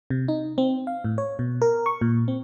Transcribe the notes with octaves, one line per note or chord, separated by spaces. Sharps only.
C3
D#4
C4
F5
A2
C#5
B2
A#4
C#6
A#2
C4